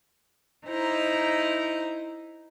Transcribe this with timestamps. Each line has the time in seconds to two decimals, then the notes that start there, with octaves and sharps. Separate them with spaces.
0.66 D#4 E4 C5 A#5